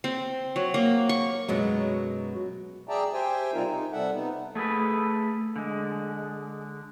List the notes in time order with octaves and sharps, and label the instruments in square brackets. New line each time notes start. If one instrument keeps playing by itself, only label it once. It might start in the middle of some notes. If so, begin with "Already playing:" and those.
[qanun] C4
F#3
A#3
C#6
[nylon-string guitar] F#2 B2 F#3 G#3
[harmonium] G#4 D5 E5 G5 A5 A#5
G4 C5 E5 G5 G#5
C3 G3 C4 D#4 F4 A#4
D#4
C3 G3 A4 E5 F#5
B3 D#4
[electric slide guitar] A3 G#4 A4 B4
D3 G#3